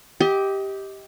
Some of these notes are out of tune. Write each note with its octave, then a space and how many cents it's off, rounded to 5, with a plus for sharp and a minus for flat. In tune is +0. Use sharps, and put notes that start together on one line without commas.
G4 +0 D#5 +30